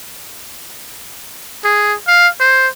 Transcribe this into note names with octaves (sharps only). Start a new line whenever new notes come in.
G#4
F5
C5